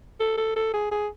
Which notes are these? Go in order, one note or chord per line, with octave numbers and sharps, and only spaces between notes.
A4
A4
A4
G#4
G#4